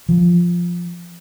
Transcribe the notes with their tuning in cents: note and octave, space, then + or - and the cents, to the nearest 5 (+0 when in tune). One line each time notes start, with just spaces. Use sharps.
F3 +0